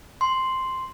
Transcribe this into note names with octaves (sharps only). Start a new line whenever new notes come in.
C6